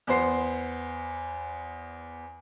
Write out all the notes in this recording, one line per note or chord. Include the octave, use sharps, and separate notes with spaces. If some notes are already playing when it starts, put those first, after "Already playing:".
E2 B3 C5 C7